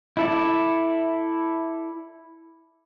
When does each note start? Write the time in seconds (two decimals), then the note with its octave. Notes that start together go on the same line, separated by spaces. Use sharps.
0.17 E4 A4 D5